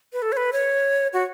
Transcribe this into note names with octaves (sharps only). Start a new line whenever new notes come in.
B4
A4
C#5
B4
C#5
F#4